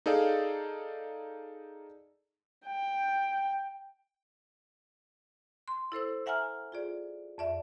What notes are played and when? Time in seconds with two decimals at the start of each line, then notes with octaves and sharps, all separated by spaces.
0.06 D#4 G#4 A4 D5 F5
2.67 G5
5.68 C6
5.92 E4 A4 C5 E6
6.26 E5 F#5 G#5 A#5 F6
6.72 F4 G#4 D5
7.38 F2 D5 E5